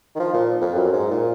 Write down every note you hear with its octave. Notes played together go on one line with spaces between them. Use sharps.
D#3
F3
A#2
F2
F#2
G#2
A#2